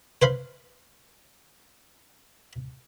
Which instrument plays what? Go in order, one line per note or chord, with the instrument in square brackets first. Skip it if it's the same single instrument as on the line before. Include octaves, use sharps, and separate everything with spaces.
[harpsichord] B4 C5 F5 B5